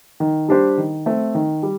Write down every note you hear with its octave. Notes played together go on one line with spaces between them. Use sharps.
D#3
G3 D4 G4 C5
D#3
A3 C4
D#3
G3